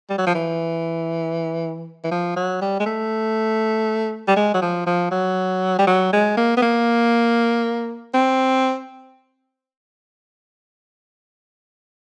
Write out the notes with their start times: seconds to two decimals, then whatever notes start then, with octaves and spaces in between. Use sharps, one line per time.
0.10 G3
0.18 F#3
0.27 F3
0.34 E3
2.04 E3
2.11 F3
2.36 F#3
2.62 G3
2.80 G#3
2.86 A3
4.28 G3
4.36 G#3
4.54 F#3
4.62 F3
4.87 F3
5.11 F#3
5.79 G3
5.87 F#3
6.13 G#3
6.37 A#3
6.57 B3
6.62 A#3
8.14 C4